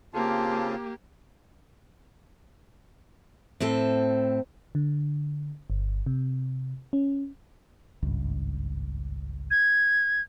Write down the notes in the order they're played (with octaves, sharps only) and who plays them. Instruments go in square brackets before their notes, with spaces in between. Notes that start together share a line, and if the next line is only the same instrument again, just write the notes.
[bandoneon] C#3 C4 F4 [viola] A#3 G4 [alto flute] A5
[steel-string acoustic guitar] A2 C4 A4
[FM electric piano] D3
G1
C3
C#4
[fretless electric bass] G#1 C#2 G2
[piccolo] G#6